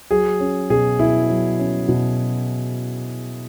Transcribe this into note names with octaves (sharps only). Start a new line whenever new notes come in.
F#3 G#4
C#4
B2 G#4
B2 E4
F#3
C#4
B2